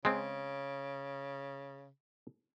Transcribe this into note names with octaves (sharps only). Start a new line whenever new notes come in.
C#3 G#3 C4